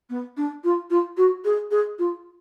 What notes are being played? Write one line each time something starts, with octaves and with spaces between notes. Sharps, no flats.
B3
D4
F4
F4
F#4
G#4
G#4
F4